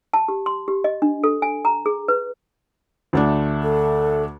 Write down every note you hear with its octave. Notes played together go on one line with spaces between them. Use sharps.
A5
G4
C6
G4
D#5
D4
A4
G#5
A#5
G#4
B4
D2 A3 D4
A4